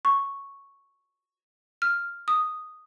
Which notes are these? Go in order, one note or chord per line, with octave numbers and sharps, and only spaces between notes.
C#6
F6
D#6